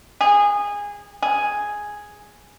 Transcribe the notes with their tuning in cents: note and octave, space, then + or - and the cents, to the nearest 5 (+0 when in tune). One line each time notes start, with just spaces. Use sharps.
G#4 -20
G#4 +0